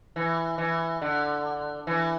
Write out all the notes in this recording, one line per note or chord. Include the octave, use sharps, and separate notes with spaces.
E3
E3
D3
E3